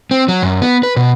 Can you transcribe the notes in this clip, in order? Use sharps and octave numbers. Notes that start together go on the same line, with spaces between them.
C4
F#3
F#2
B3
B4
B2